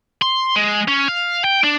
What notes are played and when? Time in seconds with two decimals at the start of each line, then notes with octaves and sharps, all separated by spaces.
0.22 C6
0.56 G#3
0.88 C#4
1.08 F5
1.44 G5
1.64 D4